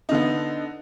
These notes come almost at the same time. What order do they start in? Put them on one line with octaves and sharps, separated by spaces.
D#4 D3 B3